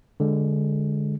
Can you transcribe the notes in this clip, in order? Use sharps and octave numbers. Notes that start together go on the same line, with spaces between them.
D3 G#3